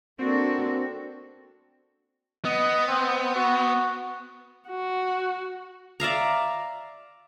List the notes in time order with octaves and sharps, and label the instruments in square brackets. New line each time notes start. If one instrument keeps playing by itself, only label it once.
[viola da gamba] A#3 D4 A4 [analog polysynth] C4 [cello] F#4
[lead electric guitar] B3 [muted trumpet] D#5
[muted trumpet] C4
F#4
[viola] F#4
[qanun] D5 E5 F5 A#5